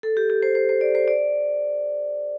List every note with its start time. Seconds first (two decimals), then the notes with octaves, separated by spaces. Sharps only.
0.03 A4
0.17 G4
0.30 G4
0.43 C5
0.55 C5
0.69 C5
0.81 D5
0.95 C5
1.08 D5